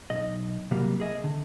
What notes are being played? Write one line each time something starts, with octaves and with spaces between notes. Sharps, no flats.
B1 D#5
C3 F#3 G3 A#3
G#4 D#5 E5
D3